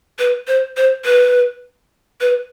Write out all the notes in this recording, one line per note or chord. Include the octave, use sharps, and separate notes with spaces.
B4
C5
C5
B4
B4